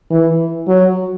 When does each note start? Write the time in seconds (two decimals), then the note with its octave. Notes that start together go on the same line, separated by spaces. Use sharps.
0.10 E3
0.68 F#3